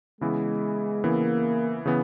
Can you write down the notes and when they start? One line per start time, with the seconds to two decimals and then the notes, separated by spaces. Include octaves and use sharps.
0.21 C#3 E3 G#3 B3 E4
1.04 C#3 E3 A#3 B3 E4
1.86 C#3 E3 B3